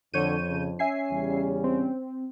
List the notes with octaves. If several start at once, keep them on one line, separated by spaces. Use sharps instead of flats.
F2 D3 C#5 G6 D#7
C#3
C#4 E5 G#5 C7
E2 C#3 G3
C4